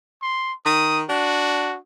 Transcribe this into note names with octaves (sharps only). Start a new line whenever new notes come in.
C6
D#3 D#6
D4 F#4